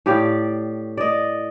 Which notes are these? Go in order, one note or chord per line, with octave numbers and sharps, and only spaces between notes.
A2 G4 D5 F5
D5 D#5